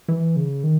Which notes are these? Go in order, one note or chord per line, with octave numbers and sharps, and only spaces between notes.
E3
C#3
D#3